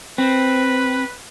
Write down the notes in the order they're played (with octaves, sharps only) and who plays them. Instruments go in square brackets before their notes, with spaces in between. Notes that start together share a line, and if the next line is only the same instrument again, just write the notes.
[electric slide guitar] C4 [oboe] B4